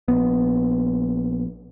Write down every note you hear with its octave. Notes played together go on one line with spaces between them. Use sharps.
A#1 B3